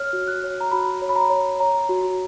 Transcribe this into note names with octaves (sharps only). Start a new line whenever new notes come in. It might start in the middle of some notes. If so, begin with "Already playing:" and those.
Already playing: C#5 F6
F#4
F#6
C#5
A#5
F#4 B5
C#5
B5
A#5
C#5
C#5 A#5
F#4